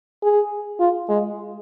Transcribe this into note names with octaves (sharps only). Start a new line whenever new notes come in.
G#4
F4
G#3